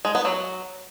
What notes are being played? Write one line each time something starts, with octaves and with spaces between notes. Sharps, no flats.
G#3
B3
F#3